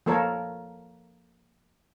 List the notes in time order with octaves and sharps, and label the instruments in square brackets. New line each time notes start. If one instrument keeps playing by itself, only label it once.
[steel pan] F3 A#3 A4 A#4 C#5